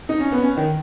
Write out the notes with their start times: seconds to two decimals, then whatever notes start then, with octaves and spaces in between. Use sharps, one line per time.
0.09 D#4
0.20 C#4
0.32 B3
0.42 C#4
0.57 D#3